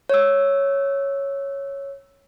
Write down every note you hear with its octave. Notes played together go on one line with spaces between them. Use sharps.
C#5 E6